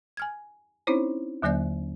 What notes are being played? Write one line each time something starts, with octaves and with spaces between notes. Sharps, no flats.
G#5 F6 G#6
C4 C#4 D#4 E4 C5 C#5
D#2 D3 F#3 A#3 D5 G6